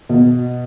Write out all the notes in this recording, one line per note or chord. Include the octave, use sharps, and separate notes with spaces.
B2